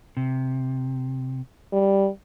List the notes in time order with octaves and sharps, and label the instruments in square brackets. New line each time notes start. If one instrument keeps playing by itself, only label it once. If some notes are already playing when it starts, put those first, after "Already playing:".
[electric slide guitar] C3
[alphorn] G3